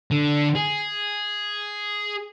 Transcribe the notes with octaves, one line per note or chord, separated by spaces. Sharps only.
D3
G#4